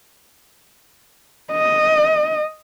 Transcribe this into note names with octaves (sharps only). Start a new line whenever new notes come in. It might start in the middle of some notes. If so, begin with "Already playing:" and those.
D#5